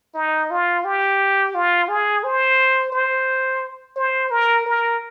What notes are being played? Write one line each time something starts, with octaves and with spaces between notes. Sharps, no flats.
D#4
F4
G4
F4
G#4
C5
C5
C5
A#4
A#4